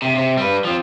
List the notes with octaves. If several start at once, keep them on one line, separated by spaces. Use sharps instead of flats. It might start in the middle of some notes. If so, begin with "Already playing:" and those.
C3
C3
G3 B4
F3 C4